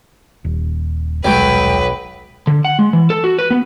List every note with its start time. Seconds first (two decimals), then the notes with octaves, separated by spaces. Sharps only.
0.44 D#1
1.25 D#1 B1 F#3 G#3 B4 G5
2.47 D3
2.65 F#5
2.79 G#3
2.93 E3
3.10 A4
3.24 F#4
3.39 B4
3.51 B3